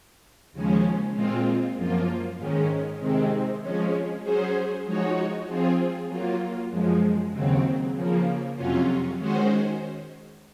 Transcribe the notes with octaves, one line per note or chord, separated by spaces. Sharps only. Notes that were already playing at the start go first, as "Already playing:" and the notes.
D#2 C#3 F3 G#3 C#4
A#2 G#3 C4 F4
F#2 F3 A#3 F4
G#2 D#3 G#3 C#4
C3 D#3 G#3 C4
F3 G#3 C#4
F#3 C#4 G#4 C5
F3 G#3 D#4 F#4 C#5
F3 C4 F4 G#4
F#3 A#3 F4
F#2 F3 G#3
D#2 C#3 F#3 C4
C#3 F3 A#3
F2 C3 F#3 C#4 F4
D#3 G#3 C#4 F#4 C5